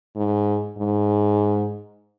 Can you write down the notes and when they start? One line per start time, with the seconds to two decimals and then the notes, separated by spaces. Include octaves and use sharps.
0.16 G#2
0.78 G#2